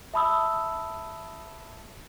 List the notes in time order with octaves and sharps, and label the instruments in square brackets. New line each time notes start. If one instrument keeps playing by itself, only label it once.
[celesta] E5 A5 B5 D#6 E6